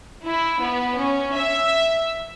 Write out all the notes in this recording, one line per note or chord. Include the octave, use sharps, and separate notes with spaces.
E4
B3
C#4
E5